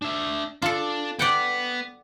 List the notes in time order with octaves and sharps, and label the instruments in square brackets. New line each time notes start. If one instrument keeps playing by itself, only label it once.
[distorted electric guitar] D4 E5
[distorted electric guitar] D4 [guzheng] F4 A4
[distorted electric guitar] B3 [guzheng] D5 F#5 G5